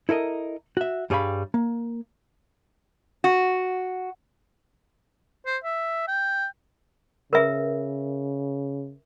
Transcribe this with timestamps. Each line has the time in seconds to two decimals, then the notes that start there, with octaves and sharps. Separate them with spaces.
0.09 E4 A4 A#4 D#5
0.77 F#4 E5
1.10 G2 G3 G#4 C#5 F5 B5
1.54 A#3
3.24 F#4
5.46 C5
5.64 E5
6.08 G5
7.33 C#3 A#4 B4 E5